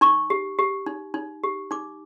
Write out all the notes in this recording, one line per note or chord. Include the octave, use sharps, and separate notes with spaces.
D#4 C#6
G4
G4
D#4
D#4
G4
D#4 D6